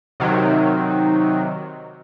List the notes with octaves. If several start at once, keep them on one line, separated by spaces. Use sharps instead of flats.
C3 D#3 F#3